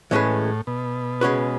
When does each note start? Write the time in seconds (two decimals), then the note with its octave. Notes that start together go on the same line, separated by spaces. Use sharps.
0.11 A2 E3 G#3 C#4 G#4 B4
0.67 B2
1.21 C#3 G#3 C#4 F#4 B4